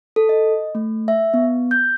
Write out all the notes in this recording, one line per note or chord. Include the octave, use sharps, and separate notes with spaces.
A4
D#5
A3
E5
B3
G6